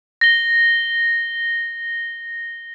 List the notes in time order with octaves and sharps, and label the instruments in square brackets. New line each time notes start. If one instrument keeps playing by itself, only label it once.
[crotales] A#6 G7